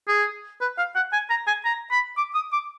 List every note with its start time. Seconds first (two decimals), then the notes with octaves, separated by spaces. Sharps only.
0.08 G#4
0.61 B4
0.78 F5
0.95 F#5
1.13 G#5
1.30 A#5
1.47 G#5
1.65 A#5
1.91 B5
2.17 D6
2.35 D#6
2.53 D6